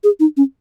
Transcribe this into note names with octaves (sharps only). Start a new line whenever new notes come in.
G#4
D#4
C#4